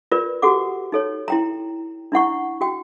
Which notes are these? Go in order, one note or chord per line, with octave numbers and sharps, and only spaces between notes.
F4 A#4 B4 D5
F#4 G4 A4 F#5 D6
D#4 A4 C#5
E4 G5 A#5
D4 E4 F#5 C#6
F#4 G5